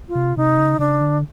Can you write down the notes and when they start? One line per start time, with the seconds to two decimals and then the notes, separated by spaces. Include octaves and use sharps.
0.08 F4
0.15 C3
0.37 C3 D#4
0.58 C#3
0.79 C#3 D4
1.01 D3